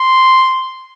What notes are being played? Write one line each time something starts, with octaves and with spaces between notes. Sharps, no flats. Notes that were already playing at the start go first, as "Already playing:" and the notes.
Already playing: C6